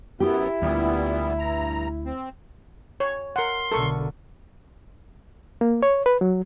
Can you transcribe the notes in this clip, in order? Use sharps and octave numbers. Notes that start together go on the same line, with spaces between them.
F#2 B3 E4 G4
D2 A#2 G3 B3
G2 A#5
C4
C#5
A#4 F#5 C6
B1 D3 A4 A#4 C#6
A#3
C#5
B4
F#3